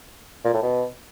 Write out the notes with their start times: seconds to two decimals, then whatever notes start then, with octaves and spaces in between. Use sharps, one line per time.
0.45 A#2
0.54 A2
0.63 B2